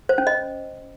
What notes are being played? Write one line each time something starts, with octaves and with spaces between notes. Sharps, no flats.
C5
C#4
D#5